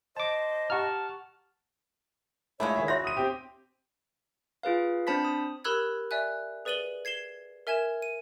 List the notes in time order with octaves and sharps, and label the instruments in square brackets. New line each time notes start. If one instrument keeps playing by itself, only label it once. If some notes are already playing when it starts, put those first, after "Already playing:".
[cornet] C5 [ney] D#5 [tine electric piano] A5 D6
[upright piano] G4 F#5 A#5 [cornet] A5 [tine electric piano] C#6 F6
[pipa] D3 F3 E4 [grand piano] G#3 A3 [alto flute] C#5
[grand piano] D#3 G#4 E5
[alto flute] F#4 [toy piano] C#5 E5 C6 [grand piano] A#6
[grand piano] D#6 D#7
[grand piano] C4 G4 [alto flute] C5
[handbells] F4 G#4 B4 F5
C4 D4 C5 A5 B5 B6
D#6
[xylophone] G4 A#4 B5 E6 F#6 G#6
D5 E5 G#5 F#6
G#4 B4 D5 D#7 F#7 G7
G#6 C7 E7 G7
A#4 E5 G#5 G#6 E7
D#7